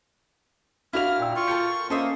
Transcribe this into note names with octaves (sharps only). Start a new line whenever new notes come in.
D4 E4 F#4 A#4 F5 F6 F7
A#2 G5 E6
F4 C#6
A4 A#4 G5 C#7
A#3 C#4 A4 C5 D#5 E5